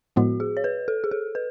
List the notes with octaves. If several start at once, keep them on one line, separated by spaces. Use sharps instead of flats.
A2 F3 G#3 B3 F#4
G#4
C#5
B4
A4
G#4
A4
B4